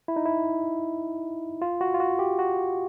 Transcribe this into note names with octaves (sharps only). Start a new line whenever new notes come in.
E4
D#4
E4
F4
F#4
F4
F#4
G4
F#4